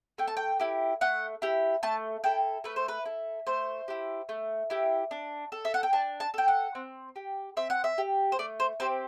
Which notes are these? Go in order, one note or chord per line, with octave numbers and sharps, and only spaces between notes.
A3 G5
A5
G5
E4 G4
A3 F#5
E4 G4
A3 A5
E4 A4 G5
A3 B4
C5
B4
E4 A4
A3 C5
E4 G4
A3
E4 G4
D4
A4
E5
F#5
G5
D4 A5
A5
A4 G5
F#5
C4
G4
C4 E5
F#5
E5
G4
C5
A3 D5
C5
C4 G4 C5